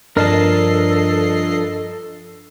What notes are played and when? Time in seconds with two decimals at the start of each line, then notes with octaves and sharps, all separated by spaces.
0.17 G2 F3 D4 A4 A#4 D#5 A5 C7